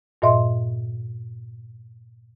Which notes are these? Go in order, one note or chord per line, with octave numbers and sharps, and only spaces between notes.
G2 A#2 D#5 E5 C6